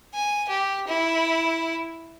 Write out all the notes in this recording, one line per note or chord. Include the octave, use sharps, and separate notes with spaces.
G#5
G4
E4